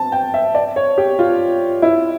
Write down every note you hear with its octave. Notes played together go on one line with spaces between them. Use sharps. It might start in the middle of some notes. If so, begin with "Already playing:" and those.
Already playing: A5
G5
E5
D5
C#5
G4
F4
E4